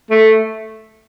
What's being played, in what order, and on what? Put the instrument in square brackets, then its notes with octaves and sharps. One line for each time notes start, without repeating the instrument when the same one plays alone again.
[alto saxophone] A3